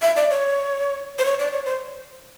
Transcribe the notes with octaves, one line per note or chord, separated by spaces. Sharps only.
E5
D5
C#5
C5
C#5
D5
C#5
C5